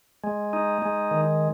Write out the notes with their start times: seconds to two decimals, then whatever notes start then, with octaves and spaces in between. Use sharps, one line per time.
0.24 G#3
0.53 D#4
0.82 G#3
1.11 D#3